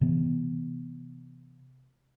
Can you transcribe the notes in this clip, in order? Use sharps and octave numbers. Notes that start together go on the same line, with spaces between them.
C3 E3 B3